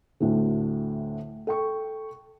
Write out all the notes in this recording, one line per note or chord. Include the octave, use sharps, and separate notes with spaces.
D2 A2 D3
A4 G5 C#6